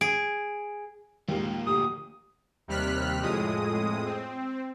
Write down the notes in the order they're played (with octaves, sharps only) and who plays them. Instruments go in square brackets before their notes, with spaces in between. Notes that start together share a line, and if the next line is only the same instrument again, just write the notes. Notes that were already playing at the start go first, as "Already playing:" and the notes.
[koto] G#4 [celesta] D7
[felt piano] D#2 G#3 [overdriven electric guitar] F3 A#3
[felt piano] D2 [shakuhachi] G4 [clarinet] D#6
[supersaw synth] D#2 C3 G3 F6 F#6 B6
F2 A2 G#3 D#6
C4